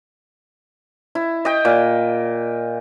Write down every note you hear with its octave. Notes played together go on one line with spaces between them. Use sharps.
E4
D#5 G5
A#2